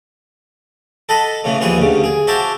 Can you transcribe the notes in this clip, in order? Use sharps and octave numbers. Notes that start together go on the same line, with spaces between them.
A4 D#5 F#5 A5 B5
A2 C#3 E3
D#2 E3 F3 G#4 F#5
D2 G2 C#3
G#4
F#4 C5 E5 F5 A5 D6